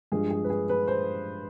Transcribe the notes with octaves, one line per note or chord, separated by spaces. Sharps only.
G2 F3 G#3 G#4
G#4
B4
G#4
B4
C5